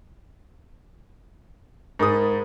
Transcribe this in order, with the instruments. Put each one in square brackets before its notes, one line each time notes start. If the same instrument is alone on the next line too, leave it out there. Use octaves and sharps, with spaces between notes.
[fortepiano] G#2 D#6 [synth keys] G#4 A#4 B5